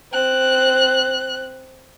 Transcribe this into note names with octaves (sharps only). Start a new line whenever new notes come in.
C4 F#6